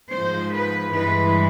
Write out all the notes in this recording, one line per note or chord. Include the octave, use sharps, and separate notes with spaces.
G#2 F3 G#3 C5
B4
G2 E3 G#3 B4